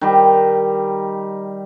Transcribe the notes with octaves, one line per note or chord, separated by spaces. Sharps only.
D#3 G3